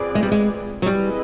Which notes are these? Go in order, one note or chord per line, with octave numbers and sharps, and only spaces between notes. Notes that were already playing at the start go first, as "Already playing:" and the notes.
Already playing: C4 F4 G#4 B4 D5
G#3
G3
G#3
F#3
G3 C4 E4 G#4 B4 D#5